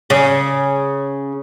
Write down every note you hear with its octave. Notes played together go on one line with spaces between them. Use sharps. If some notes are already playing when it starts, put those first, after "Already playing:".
C#3